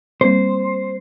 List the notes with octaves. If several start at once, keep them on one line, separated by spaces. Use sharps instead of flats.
G3 A#3 C4 C5